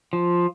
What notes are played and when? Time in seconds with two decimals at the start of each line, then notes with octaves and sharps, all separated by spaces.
0.13 F3